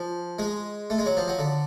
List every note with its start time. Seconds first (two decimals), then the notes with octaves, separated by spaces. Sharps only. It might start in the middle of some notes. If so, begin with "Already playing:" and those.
Already playing: F3
0.39 G#3
0.90 A3
0.98 G#3
1.06 F#3
1.17 F3
1.28 F#3
1.39 D3